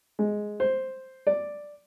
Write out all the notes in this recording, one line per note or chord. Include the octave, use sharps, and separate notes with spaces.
G#3
C5
D5